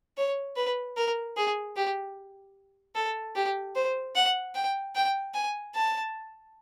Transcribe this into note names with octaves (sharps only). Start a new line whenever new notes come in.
C#5
B4
A#4
G#4
G4
A4
G4
C5
F#5
G5
G5
G#5
A5